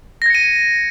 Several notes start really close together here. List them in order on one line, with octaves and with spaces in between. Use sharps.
A#6 G#6 C#7 D#7